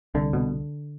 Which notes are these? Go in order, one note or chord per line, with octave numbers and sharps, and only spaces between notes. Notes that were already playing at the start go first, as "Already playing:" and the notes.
C2 D3
B2